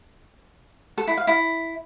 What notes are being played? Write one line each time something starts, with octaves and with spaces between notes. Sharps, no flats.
A4
E4
F5
E4